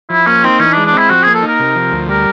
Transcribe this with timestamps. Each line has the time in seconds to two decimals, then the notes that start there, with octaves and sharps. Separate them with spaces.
0.10 F3 E4
0.27 A#3 C#4
0.44 C4 D#4
0.60 E3 C#4
0.72 D4
0.77 G#3
0.85 D4
0.93 C4 E4
1.09 F3 F#4
1.23 A#3 G#4
1.34 A4
1.42 D#4 A#4
1.59 C3
1.75 F3
1.92 D2
2.09 G3 A#4